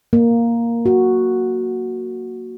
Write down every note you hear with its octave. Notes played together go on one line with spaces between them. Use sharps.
A#3
F#4